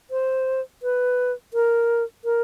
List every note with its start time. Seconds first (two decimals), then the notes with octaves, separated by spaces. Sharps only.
0.11 C5
0.83 B4
1.54 A#4
2.25 A#4